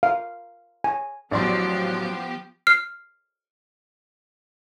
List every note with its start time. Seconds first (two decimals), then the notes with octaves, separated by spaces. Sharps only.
0.03 F5
0.84 G#5
1.31 A1 F3 F#3 B3 G4 D5 C6
2.67 F6 C7